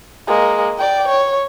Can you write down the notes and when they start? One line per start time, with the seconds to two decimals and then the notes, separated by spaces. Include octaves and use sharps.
0.27 G#3 A#3
0.78 D5 G5
1.08 C#5